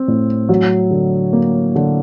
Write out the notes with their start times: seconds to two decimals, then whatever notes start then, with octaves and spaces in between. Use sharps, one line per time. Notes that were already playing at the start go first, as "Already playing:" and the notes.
Already playing: C4
0.08 A2
0.49 F#3
0.91 D3
1.33 A#3
1.76 D3